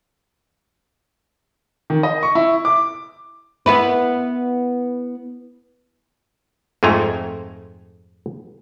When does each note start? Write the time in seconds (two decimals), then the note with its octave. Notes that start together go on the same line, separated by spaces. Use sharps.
1.90 D#3
2.03 D#5
2.23 C#6
2.35 E4
2.65 D6
3.66 B3 E4 B4
6.83 F2 G#2 A3 G#5 A#5